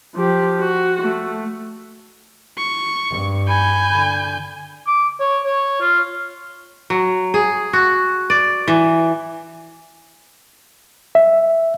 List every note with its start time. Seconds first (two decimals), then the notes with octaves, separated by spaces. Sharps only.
0.15 F3 G4
0.61 F#4
1.03 A3
2.58 C#6
3.10 G2
3.48 G#5 B5 G6
3.92 D3
4.87 D6
5.20 C#5
5.44 C#5
5.81 F4
6.90 F#3
7.34 G#4
7.73 F#4
8.30 D5
8.68 E3
11.15 E5